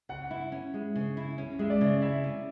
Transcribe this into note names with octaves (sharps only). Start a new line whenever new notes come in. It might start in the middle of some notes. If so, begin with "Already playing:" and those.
C#3 F#5
E4
C#4
G#3
C#3
E4
C#4
G#3 E5
D5
C#3
E4 E5
C#4